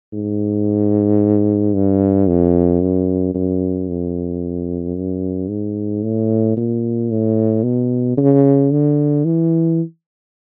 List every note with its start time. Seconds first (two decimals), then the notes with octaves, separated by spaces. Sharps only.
0.13 G#2
1.74 G2
2.28 F2
2.82 F#2
3.35 F#2
3.89 F2
4.96 F#2
5.49 G#2
6.03 A2
6.57 A#2
7.11 A2
7.64 B2
8.17 C#3
8.71 D3
9.25 E3